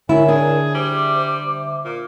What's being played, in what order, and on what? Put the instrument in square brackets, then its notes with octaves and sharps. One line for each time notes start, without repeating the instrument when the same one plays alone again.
[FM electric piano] D3 E5 [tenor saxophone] F#3 [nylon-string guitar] E4 [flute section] A#4 C#5 G#5
[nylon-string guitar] D4 [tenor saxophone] G#4
[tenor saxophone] G3 [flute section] C5 D6
[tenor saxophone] A#2